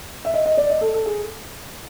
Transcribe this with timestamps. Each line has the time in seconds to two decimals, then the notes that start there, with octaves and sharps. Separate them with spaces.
0.25 E5
0.34 D#5
0.46 D#5
0.57 D5
0.70 D#5
0.81 A4
0.94 A4
1.06 G#4